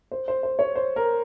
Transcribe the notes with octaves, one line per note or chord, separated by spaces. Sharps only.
C5
C5
C5
C#5
C5
A#4